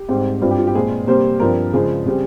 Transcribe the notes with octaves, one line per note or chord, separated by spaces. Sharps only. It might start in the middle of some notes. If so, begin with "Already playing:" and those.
Already playing: G4
G#2 G3 C4
G2 G3 C4 F4
G4
F4
G4
A#2 G#3 C4 G#4
C3 G3 A#3 C5
G2 F3 C4 A#4
C#3 F3 G#3 G#4
C#3 G3 C4